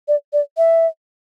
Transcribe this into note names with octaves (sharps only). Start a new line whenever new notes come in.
D5
D5
E5